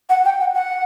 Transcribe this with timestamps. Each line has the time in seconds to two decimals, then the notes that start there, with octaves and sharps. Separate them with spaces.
0.09 F#5
0.25 G5
0.40 F#5
0.55 F#5